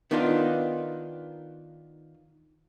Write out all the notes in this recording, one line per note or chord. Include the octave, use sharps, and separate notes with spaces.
D#3 B3 D4 D#4 F4